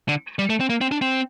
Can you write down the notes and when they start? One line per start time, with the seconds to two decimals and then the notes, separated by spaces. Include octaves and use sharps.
0.09 D3
0.39 G3
0.50 A3
0.60 C4
0.70 A#3
0.81 C4
0.92 D4
1.01 C4